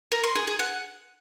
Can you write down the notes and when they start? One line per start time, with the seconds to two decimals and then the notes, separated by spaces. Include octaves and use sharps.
0.12 A#4
0.24 C6
0.35 G#4
0.47 G#4
0.59 F#5